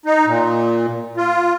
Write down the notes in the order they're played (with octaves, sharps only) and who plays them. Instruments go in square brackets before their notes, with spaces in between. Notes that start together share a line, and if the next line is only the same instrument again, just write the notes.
[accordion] D#4
A#2
F4